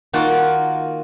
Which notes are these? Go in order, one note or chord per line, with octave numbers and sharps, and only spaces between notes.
D#3 A#3 F4 F#4 F#5 A5